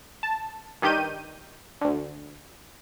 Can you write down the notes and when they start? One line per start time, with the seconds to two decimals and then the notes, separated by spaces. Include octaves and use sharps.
0.23 A5
0.82 G2 D#3 G4 G6 D#7
1.81 D2 D3